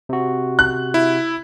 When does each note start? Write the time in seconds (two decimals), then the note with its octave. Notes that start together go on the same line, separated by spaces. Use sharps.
0.09 C3 F#4
0.59 F#6
0.94 E4